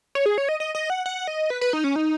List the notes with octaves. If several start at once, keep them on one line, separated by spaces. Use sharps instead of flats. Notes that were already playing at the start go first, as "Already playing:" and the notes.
C#5
G#4
C#5
D#5
D#5
D#5
F#5
F#5
D#5
B4
B4
D#4
C#4
D#4